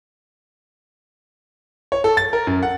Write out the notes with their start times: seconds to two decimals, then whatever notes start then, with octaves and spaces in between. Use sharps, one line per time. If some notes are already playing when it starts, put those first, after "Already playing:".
1.92 C#5
2.04 A4
2.17 A6
2.33 A#4
2.47 F#2
2.63 F#5